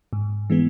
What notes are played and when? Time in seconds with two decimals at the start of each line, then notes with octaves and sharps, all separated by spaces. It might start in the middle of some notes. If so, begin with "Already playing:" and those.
0.13 G#2
0.50 E3 G#3 B3